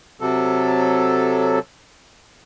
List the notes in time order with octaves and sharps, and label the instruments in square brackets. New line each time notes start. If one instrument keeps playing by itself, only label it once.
[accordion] C3 F#3 A4